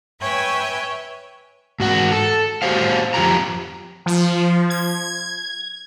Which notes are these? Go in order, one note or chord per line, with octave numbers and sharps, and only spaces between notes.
B4 C#5 E5 G5 G#5
G#2 F#4 F#5
A4
F#4 G4 C5 F5
F2 B2 F4 G4 A#5
F3
G#6